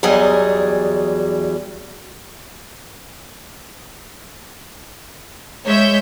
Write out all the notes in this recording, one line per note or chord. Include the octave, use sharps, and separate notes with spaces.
E2 E3 F#3 G3 G#4 D#5
G#3 C#5 E5 G6